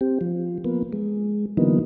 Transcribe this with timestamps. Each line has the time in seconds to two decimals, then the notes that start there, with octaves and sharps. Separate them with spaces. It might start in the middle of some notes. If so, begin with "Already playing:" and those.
0.01 C4 G4
0.21 F3
0.64 F3 A#3 B3
0.93 G#3
1.57 D3 E3 F#3 A#3 B3 D#4